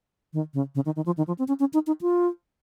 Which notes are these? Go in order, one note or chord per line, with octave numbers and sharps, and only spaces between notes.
D#3
C#3
C#3
D#3
D#3
F3
D#3
F3
C4
C#4
C#4
D#4
D#4
F4